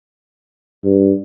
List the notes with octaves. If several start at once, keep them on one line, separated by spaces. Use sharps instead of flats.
G2